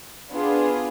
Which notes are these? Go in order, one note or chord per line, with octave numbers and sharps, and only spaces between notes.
B3 D4 F4 G#4